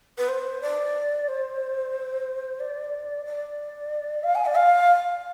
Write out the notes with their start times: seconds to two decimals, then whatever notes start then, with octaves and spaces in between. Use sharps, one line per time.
0.18 B4
0.28 C5
0.61 D5
1.28 C5
2.59 D5
3.25 D5
4.23 F5
4.35 G#5
4.45 D5
4.56 F5